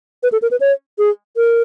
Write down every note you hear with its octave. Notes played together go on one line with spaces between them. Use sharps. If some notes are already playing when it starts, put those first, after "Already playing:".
B4
A4
A#4
B4
C#5
G#4
A#4